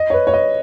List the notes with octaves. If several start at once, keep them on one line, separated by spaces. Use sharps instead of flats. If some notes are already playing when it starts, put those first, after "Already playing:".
Already playing: D#5
C#5
B4
C#5
D#5